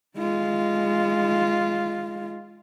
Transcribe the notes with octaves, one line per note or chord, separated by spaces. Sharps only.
G#3 F4